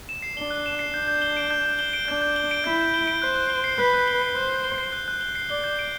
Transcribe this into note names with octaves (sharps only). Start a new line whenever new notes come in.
E7
C7
D4 G7
F#6
E7
C7
D4 G6
G6
G7
D7
G6
G6
G7
D7
D4 G6
G6
G7
D7
E4 G6
G6
G7
D7
C5 F#6
F#6
G7
C7
B4 F#6
F#6
G7
C7
C5 F#6
F#6
G7
C7
F#6
F#6
G7
C7
D5 G7
G6
D7